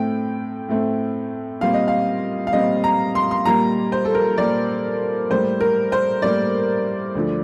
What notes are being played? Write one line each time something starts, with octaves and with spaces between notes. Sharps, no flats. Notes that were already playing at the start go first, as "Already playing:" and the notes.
Already playing: A2 A3 C4 G5
A2 A3 C4
A#2 G3 C4 F5
D#5
F5
F5
A#2 G3 C4 D#5
A#5
C6
C6
A#2 G3 A#3 A#5
C5
A4
A#4
A#2 G3 A#3 D5
A2 G3 A#3 C5
A#4
C5
A2 G3 A#3 D5
D2 D3 F3